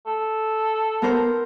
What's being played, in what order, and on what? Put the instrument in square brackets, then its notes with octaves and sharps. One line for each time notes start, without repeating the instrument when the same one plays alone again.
[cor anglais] A4
[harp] B3 A#4 C5